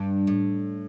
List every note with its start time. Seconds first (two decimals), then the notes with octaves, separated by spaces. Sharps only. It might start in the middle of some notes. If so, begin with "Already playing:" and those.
Already playing: G2
0.27 A2